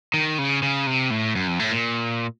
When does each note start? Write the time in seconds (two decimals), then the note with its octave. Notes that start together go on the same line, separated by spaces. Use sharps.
0.14 D#3
0.39 C#3
0.63 C#3
0.87 C3
1.11 A2
1.36 F#2
1.48 F2
1.59 A2
1.71 A#2